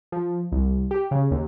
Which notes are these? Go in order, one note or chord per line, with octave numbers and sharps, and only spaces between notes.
F3
C2
G4
C#3
D#2